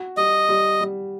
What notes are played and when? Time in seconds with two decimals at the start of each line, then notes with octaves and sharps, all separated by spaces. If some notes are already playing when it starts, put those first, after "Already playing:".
Already playing: F#4
0.17 G3 D#5
0.49 G3
0.81 G3